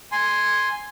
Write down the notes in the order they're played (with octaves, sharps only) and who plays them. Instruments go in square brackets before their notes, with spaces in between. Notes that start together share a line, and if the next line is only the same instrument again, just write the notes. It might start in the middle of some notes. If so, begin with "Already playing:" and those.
[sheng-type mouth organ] G#5 C6